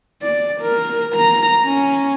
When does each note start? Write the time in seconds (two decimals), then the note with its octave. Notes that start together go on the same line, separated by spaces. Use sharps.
0.22 D5
0.61 A#4
1.16 A#5
1.65 C#4